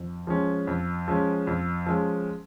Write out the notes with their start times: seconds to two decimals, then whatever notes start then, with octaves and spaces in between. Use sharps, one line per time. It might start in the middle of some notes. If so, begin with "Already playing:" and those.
Already playing: F2
0.27 F3 G#3 C#4
0.67 F2
1.08 F3 G#3 C#4
1.47 F2
1.86 F3 G#3 C#4